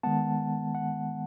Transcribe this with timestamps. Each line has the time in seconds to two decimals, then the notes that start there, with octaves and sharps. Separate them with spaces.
0.03 D#3 G#3 B3 F#5 A5
0.75 F#5